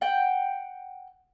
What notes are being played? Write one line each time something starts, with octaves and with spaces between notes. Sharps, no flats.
F#5 G5